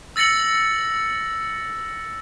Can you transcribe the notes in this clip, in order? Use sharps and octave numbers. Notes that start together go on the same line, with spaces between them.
E6 A6 A#6 C#7 F#7